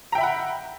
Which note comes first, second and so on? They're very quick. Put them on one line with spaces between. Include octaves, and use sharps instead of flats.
A#5 G5 E5 B5 F#5